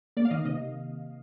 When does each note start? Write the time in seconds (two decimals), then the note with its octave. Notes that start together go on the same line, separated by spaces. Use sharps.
0.17 A#3 D5
0.25 F5
0.31 D#3 D#5
0.45 C3 D#5